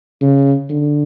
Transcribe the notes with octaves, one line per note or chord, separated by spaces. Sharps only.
C#3
D3